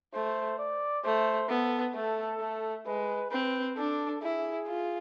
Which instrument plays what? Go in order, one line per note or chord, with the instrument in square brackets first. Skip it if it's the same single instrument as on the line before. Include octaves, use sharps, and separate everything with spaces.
[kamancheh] A3 [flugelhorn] C5
[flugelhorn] D5
[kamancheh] A3 [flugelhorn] C5
[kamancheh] B3 [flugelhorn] A4
[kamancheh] A3 [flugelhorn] A4
[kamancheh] A3
[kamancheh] G#3 [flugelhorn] B4
[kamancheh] C4 [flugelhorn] B4
[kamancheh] D4 [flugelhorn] A4
[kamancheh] E4 [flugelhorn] G#4
[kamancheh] F4